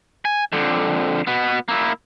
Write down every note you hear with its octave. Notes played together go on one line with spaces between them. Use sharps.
G#5
F2 D3
B2 B3
A#3 E4